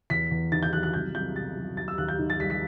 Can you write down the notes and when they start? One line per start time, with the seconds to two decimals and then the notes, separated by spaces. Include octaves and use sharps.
0.10 E2 B6
0.31 E2
0.52 D#3 A6
0.63 G6
0.73 F#3 F#6
0.83 F#6
0.93 C2 G6
1.14 C2 G6
1.36 B2 A6
1.57 F#3
1.77 D#2 A6
1.88 E6
1.98 D#2 F#6
2.08 G6
2.19 D#3
2.30 A6
2.40 G3 B6
2.50 B6